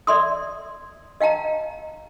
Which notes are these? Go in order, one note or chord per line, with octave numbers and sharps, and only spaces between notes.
D5 E5 C6 D#6
D#5 F5 G5 A5 A#5